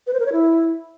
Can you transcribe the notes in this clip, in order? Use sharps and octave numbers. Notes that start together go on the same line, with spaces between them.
B4
C5
A#4
C#5
E4